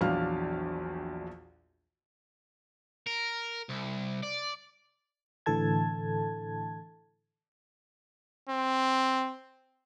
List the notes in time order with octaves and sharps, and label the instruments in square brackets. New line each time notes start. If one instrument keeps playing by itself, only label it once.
[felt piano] A#1 E2 F#3 D4 F5 F6
[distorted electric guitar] A#4
C2
D5
[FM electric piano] A2 D3 E3 A4 A5 G#6
[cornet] C4